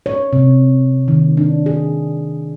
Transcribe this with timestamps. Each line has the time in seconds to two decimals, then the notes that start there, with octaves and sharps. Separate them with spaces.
0.06 C#5
0.33 C3
1.08 D#3
1.37 D4
1.66 G#4